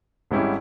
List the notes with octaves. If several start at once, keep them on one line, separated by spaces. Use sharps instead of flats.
G#1 G#2 G3 C#4 E4